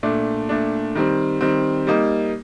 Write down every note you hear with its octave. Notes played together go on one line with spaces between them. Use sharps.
A#2 A3 D4
A#2 A3 D4
D#3 G3 C4
D#3 G3 C4
G3 A#3 D#4